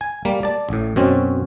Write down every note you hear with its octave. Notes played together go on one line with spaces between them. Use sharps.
G#5
G3 A#3
D5 A5
A1 A2
F#2 B2 C4 C#4